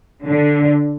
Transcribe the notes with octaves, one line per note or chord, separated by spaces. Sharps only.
D3